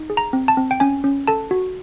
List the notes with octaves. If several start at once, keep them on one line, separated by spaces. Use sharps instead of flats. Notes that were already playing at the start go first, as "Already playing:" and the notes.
Already playing: D#4
G#4
A#5
C4
A5
C4
G5
C#4 G#5
C#4
A4 A5
F#4